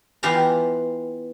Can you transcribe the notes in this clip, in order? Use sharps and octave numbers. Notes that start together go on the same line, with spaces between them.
E3 B3 F4 G4 A5 A#5